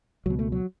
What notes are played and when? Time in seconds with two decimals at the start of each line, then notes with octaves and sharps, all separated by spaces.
0.26 C#2 B2 F#3
0.39 A3
0.52 F#3